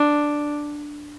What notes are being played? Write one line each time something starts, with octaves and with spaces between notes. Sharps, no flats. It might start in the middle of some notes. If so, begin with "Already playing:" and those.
Already playing: D4